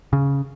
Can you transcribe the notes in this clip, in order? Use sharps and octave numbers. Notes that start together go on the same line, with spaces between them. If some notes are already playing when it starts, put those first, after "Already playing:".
C#3